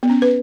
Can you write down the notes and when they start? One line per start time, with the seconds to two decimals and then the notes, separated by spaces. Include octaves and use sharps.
0.03 B3
0.10 C#4
0.22 B4